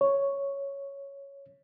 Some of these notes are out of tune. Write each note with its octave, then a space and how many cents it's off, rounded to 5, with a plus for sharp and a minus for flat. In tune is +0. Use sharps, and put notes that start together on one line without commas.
C#5 +0